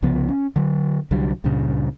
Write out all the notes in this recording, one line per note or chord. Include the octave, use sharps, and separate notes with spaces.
C2 C#3 F3 B3
C#4
D3 F#3
C2 D3 F#3 G3
C#2 G2 A#2 C#3